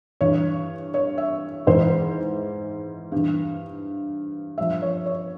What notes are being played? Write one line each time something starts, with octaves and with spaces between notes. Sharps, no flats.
G2 E3 C#5
C#5
E5
G#2 E3 C5
G2 E3
G2 F3 E5
C#5
C#5